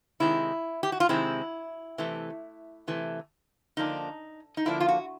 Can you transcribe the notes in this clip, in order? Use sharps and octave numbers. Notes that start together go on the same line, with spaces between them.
C3 D#3 G#3 C4 E4
G4
F#4
F4
C3 D#3 G#3 C4 E4
C3 E3 A3
C3 E3 A3
D3 F3 A#3 D4 D#4
D#4
D3 F3 A#3 D4 E4
F4
F#4